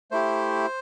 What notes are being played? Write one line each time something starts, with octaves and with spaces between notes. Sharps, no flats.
A3 E4 G4 C5